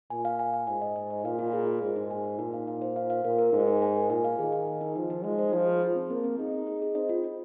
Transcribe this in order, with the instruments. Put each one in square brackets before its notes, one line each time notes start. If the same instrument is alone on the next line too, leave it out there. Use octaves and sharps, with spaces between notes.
[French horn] A#2 [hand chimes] G#5
[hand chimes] F5
G#5
G#5
[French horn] G#2 [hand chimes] G#5
[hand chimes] D#5
G#5
D#5
[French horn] A#2 [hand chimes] F5
[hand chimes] F4
G#4
G#4
[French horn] G#2 [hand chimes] A#4
[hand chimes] D#4
G#5
D#4
[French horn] A#2 [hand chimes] D#4
[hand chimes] F5
F5
C5
F5
F5
[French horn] A#2 [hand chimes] A#4
[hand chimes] A#4
[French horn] G#2 [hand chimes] D#4
[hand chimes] G#5
G#5
A#4
[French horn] A#2 [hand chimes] G#5
[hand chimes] F5
[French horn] D#3 [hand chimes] G#4
[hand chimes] G#5
G#4
D#4
[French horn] F3 [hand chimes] D#4
[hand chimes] D#4
[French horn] G#3 [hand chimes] C5
[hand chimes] C5
[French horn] F3 [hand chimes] F4
[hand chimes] G#4
G#4
C4
[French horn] A#3 [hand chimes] C4
[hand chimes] C4
[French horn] D#4 [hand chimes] G#4
[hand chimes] G#4
G#4
G#4
[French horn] C4 [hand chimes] D#5
[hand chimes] F4
F4